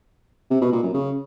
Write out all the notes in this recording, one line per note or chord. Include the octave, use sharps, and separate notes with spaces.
C3
B2
A#2
F#2
C#3